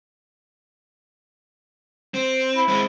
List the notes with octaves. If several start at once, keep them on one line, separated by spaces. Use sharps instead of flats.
C4
E4
G#3 C4